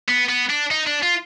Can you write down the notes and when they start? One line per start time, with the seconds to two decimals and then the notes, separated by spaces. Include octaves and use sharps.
0.08 B3
0.29 B3
0.50 D4
0.71 D#4
0.87 D4
1.03 F4